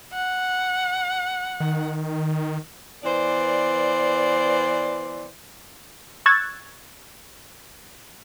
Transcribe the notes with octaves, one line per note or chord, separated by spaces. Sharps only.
F#5
D#3
E3 B3 C5 D5
C#6 E6 F#6 G#6 A6